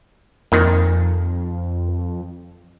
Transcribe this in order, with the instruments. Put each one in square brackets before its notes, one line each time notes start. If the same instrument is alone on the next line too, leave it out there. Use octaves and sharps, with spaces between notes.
[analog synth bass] F2 [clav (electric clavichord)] A#2 D#3